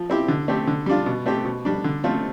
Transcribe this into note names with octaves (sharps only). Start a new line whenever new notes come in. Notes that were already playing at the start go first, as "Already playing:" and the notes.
Already playing: F3
C4 E4 G4
D3
A3 C4 G4
D3
G3 D4 F4
B2
A3 C4 G4
B2
G3 D4
D3
A3 C4 F4